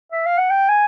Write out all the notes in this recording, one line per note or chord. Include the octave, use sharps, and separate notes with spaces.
E5
F5
F#5
G5
G#5